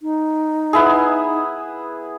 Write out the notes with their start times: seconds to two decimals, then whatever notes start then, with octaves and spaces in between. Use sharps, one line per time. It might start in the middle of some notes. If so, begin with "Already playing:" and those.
0.02 D#4
0.73 B3 E4 G#4